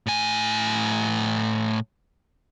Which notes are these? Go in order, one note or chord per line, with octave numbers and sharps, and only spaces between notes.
A2 G#5